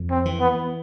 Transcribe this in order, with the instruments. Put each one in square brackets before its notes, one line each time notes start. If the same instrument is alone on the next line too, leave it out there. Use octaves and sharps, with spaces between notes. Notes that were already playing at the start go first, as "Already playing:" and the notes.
Already playing: [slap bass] F2
[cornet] C4
[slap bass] E3
[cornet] B3